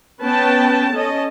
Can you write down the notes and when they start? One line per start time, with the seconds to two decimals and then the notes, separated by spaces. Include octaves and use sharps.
0.24 B3 C#4 B4 G5 A5
0.94 C#4 A4 D#5 A5